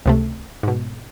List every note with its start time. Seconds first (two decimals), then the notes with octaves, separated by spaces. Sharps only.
0.06 C#2 C3 A3
0.63 G#2 B2